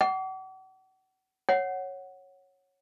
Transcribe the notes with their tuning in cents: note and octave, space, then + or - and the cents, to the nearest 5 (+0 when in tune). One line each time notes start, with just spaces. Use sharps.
F#5 +35 D6 -40
C#5 -10 F#5 +0